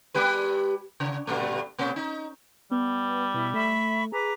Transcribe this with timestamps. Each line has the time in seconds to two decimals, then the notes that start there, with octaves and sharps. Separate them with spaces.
0.14 G#3 G4 B4
1.00 C#3
1.27 G2 A#2 A3
1.79 B2 A#3 C#4
1.96 D#4
2.71 G3 B3
3.34 B2 E4
3.54 A3 E5 B5 C#6
4.12 G#4 B4 A#5 D6